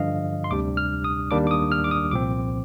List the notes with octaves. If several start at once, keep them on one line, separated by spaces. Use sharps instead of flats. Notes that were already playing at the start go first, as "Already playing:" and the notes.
Already playing: G2 D3 F3 D#5 F5
C6
D2 C3 G3 D4 D6
F6
D#6
D#2 D#3 G3 A#3 D4 D6
D6
D#6
F6
D6
D#6
C2 A#2 F3 C4 D6